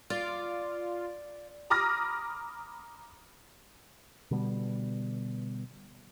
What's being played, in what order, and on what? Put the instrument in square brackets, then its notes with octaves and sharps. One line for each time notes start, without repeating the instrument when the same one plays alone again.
[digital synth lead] F4 [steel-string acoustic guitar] D5
[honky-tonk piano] A#5 B5 D6 D#6 F6 A#6
[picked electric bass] B2 D3 G3 B3